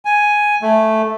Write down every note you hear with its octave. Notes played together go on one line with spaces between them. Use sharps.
G#5
A3